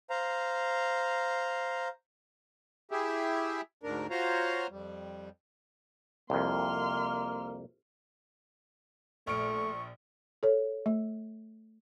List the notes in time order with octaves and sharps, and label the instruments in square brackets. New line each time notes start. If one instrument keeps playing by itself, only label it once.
[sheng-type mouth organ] C5 F5 A#5
[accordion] E4 G4 G#4 E5
D2 G#2 D4 A#4
F4 F#4 C5 C#5 F5 A#5
F2 G3
[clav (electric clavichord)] C2 F2 [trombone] A#3 [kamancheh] C6 F6
[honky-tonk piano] A#1 F6 D7 [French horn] A3 [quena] C#6
[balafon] A4 C#5
A3